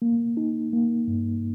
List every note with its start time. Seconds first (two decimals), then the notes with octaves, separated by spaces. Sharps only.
0.02 A#3
0.37 D#4
0.73 A#3
1.08 G2